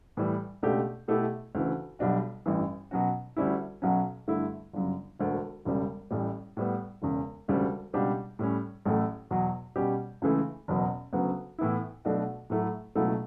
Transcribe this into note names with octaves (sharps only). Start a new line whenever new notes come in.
A2 E3 G3
C#2 B2 A3 D4 G4
B2 A3 E4 G4
D2 C#3 E3
B1 B2 G3 D4 F#4
A1 G2 E3
B2 F#3 C#4 F#4
D2 D3 G3 C#4 E4
B1 B2 F#3 C#4
G2 D3 A3 E4
G1 F#2 C#3
E1 D2 D3
E1 E2 C#3 G3
A1 A2 G3
A2 G3 B3
E1 E2 C#3
E1 D2 C#3 G3
C#2 B2 G3 D4 G4
A2 G3 C#4
A1 A2 F#3 A3
E2 B2 F#3
B2 G3 C#4 G4
C#2 C#3 E3 A3 E4
F#1 E2 B2 F#3
D2 C#3 F#3 B3
A2 E3 B3 E4
B1 B2 A3 D4 F#4
A2 F#3 A3 E4
C#2 B2 F#3 A3 E4